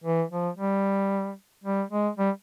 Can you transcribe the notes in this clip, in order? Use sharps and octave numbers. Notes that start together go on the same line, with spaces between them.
E3
F3
G3
G3
G#3
G3